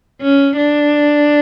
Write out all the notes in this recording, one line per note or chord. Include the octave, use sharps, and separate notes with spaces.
C#4
D4